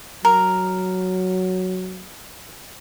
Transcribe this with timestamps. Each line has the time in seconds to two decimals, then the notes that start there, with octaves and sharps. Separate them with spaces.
0.25 F#3 A#4